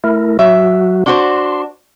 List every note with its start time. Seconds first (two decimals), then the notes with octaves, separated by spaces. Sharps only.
0.04 A3 E4 A#4
0.39 F#3 F#4 E5
1.06 D4 F#4 C5 C6